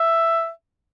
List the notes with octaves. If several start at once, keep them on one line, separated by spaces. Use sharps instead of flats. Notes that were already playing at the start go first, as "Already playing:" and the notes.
Already playing: E5